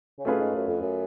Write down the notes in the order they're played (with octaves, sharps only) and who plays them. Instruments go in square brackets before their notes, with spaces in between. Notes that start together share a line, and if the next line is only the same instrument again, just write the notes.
[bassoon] C#3
[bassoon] B2 [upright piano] A3 C#4 F4 G#4 B4
[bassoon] G#2
F#2
F2
F#2